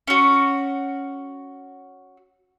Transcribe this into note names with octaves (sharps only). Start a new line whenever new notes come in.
C#4 F#4